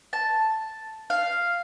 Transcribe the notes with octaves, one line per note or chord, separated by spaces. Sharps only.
A5
F5